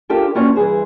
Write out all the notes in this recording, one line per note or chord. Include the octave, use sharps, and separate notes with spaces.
D4 F4 G4 A4 A#4
A#3 B3 C#4 D4 F4 F#4
G2 E3 G#4 C5